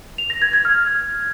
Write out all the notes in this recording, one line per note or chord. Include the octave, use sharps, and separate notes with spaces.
F7
A#6
G#6
G#6
F6